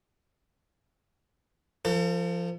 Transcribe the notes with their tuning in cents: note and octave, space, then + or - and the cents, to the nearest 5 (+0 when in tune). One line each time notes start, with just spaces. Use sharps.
F3 -15 A4 +45